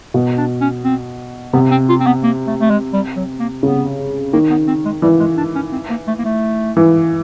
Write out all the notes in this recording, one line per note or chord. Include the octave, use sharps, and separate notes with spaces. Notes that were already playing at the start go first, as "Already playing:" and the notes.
B2
D4
C#4
C4
C3 B3
C4
F4
C4
B3
A#3
A3
A3
G#3
G3
F#3
A#3
C#3 B3
D#3 A#3
B3
C4
G#3
E3 G3
G#3
D4
C#4
C4
A#3
A3
A#3
A3
E3